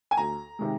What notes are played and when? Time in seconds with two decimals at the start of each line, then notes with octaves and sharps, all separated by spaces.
0.11 G#5
0.17 D2 A#5
0.59 C3 D#3 G#3